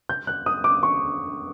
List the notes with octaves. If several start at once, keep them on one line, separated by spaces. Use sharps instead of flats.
G6
F#6
D#6
D6
C#6